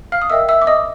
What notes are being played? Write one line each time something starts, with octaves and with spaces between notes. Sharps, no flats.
F5 F6
D#6
A#4 D#5 E5 G5 E6
E5 E6
D6
D#5 D#6